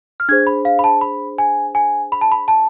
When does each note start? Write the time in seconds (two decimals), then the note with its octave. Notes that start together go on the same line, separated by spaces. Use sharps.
0.20 F6
0.29 D4 G#4 C5 G#6
0.47 B5
0.65 F5
0.79 B5
0.84 A5
1.01 B5
1.38 G#5
1.75 G#5
2.12 B5
2.21 A5
2.32 B5
2.48 A5